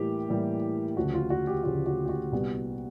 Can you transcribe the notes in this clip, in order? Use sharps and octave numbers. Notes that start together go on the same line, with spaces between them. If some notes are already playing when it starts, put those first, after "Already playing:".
Already playing: A2 E3 G3 A#3 G4
A2 E3 G3 A#3
D2 C#3 F3 F#4
F4
F#4
G4
D2 C#3 F3 F#4
F#4
G4
F#4
C2 A#2 G3 B3